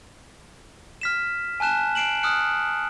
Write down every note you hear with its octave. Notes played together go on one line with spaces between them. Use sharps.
F6 B6 E7
G#5 A5 F#6 E7
C7 D7 E7 F#7
D#6 F6 F#6 C#7